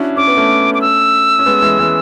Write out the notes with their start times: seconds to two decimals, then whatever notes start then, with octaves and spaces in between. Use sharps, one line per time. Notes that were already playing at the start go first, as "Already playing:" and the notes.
Already playing: C#4 D4 E4 F#4
0.17 C#4 D6
0.27 B3
0.37 A3 C#4
0.74 D6
0.81 E6
1.39 C#4
1.46 G#3 B3
1.62 E3 G#3
1.79 E3 G#3